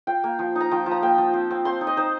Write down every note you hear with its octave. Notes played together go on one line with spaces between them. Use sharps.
F4 G5
A#3
F3
D#4
A#5
F3 G5
F3
A#5
A#3 G5
F3
C4
C4
C4 C6
D#4
D#5
D#4 C5